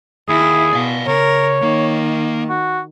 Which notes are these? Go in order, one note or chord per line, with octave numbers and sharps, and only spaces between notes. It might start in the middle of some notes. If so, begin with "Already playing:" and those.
D#2 E4 G#4
B2 D5 F5
C#3 A#4 C#5
D#3 A#3
F#4